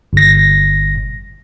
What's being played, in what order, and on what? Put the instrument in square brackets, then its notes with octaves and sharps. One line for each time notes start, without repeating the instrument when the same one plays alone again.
[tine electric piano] G1 A#6